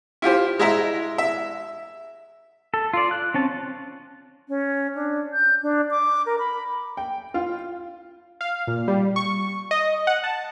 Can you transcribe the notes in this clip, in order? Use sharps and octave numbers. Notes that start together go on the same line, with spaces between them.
E4 F4 G4 C5
G#3 E4 E5 A#5
E5
A4
F4 D5
F#6
C4 C#4 A5
C#4
D4
G6
D4
D6
A#4
B5
G5
F4
F5
A#2
G3
C#6
D#5
F#5
A5